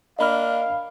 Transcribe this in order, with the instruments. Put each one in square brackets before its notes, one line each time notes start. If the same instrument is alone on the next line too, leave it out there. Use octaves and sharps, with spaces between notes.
[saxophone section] A#3 D4 [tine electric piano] D#5 B5 F6 [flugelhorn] F5